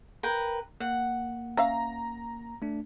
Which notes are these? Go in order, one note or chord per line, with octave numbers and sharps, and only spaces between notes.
A#4 B4 G5
A#3 F#5
C#4 E5 F5 A#5
A3 D4